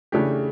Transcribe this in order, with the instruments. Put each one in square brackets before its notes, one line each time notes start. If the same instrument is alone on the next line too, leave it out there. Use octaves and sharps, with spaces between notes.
[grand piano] C#3 E3 A3 D4 G4